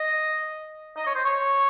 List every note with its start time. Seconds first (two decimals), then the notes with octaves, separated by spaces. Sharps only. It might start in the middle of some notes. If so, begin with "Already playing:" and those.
Already playing: D#5
0.97 D#5
1.06 C#5
1.15 C5
1.25 C#5